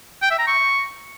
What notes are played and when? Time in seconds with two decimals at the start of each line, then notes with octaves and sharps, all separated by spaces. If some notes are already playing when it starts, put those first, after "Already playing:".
0.23 G5
0.31 E5
0.39 A#5
0.47 C#6